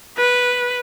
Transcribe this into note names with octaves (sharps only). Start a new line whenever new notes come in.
B4